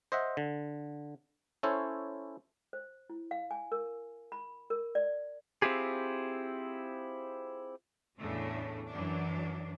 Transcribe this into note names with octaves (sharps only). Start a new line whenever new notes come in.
C5 D#5 E5 F#5
D3
C#4 E4 A4 C5 C#5
C5
E4
F5
G#5
A#4
B5
A#4
D5
C4 E4 F4 G4 G#4
E2 A2 C#3 A3 D4
F#2 E3 F#3 D4